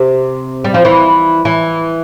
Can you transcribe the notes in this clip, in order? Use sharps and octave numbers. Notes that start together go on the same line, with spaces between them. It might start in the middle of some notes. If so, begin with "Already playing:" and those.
Already playing: C3
G3
F3
E3
E3